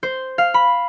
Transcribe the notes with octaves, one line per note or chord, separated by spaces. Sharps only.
C5
F5
B5